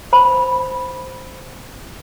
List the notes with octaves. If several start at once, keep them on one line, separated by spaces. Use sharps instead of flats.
C5 B5